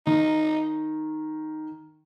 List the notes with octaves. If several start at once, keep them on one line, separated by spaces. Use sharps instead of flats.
D#3 D#4